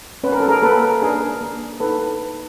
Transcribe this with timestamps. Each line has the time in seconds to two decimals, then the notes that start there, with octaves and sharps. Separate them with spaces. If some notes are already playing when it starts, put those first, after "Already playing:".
0.24 C#4 B4
0.32 A#4
0.40 A4
0.48 G#4 A#4
0.62 A#3 A4 B4
1.02 D4 G#4 A#4
1.41 A#3
1.80 D#4 A4 B4